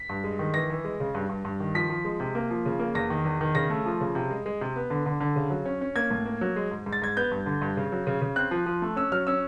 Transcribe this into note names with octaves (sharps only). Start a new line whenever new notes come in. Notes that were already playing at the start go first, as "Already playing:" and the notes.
Already playing: B6
G2
G#3
D#3
E3 A#6
E3
G#3
C#3
G2
G2
G2
D#3
F3 B6
F3
G#3
C3
A#3
F3
C#3
A#3
E2 A#6
D#3
E2
D#3
C#3 A#6
A3
F3
C#3
C3
G#3
G#3
C3
B3
D3
D3
D3
C#3
F#3
C#4
C#4
A#3 G#6
A2
A#3
F#3
G#3
G#2
G#2
A6
G#2 G#6
B3 G6
G2
D3
G2
C#3
F#3
C#3
C#3
C4 F#6
F3
F3
A3
C#4 E6
F#3 F6
C#4 E6